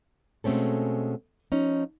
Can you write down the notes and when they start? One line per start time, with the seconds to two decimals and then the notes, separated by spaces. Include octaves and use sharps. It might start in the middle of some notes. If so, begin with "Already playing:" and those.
0.44 B2 G#3 A3 C4 C#4 A4
1.52 F3 C#4 D#4